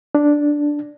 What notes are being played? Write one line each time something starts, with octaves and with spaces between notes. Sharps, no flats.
D4